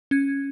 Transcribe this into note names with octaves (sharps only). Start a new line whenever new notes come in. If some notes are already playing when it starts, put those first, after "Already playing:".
C#4 G#6